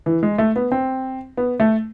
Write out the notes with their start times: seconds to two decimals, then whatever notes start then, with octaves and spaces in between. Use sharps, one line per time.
0.06 E3
0.23 G#3
0.38 A3
0.56 B3
0.72 C4
1.37 B3
1.60 A3